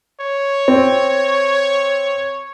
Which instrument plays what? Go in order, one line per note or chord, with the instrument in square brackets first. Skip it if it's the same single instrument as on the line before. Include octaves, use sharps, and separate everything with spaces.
[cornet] C#5
[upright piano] C4